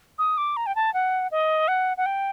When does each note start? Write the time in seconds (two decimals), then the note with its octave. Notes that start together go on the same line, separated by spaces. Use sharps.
0.18 D#6
0.37 D6
0.57 A#5
0.66 G5
0.76 A5
0.94 F#5
1.31 D#5
1.68 F#5
1.97 F#5
2.06 G5